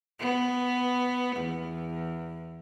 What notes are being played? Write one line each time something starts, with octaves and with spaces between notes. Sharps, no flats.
B3
E2